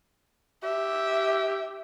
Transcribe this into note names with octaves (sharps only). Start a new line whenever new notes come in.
G4 E5